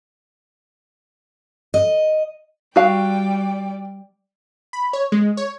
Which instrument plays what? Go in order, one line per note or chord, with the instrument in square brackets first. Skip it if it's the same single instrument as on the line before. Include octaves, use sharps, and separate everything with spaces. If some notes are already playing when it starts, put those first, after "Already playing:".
[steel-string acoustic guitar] D#5
[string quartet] G3 D5 G5 [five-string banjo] F#4 F5
[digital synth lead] B5
C#5
G#3
C#5